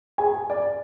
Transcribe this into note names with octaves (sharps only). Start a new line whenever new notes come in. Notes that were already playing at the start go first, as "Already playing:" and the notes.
G#4 G#5
D5